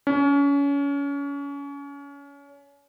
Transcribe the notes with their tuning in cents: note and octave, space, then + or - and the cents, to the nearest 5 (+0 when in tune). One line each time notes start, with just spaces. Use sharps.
C#4 +30